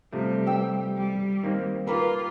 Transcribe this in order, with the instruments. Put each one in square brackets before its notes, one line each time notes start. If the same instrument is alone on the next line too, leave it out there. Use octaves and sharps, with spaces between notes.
[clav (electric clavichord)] C3 F3 A3 [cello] G3
[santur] G5 E6
[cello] G3
[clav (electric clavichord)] D#3 A#3 C4
[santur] A#3 B4 [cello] F4 [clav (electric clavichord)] G4